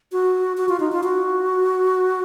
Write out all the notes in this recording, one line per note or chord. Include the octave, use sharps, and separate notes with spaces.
F#4
F#4
F4
D#4
F4
F#4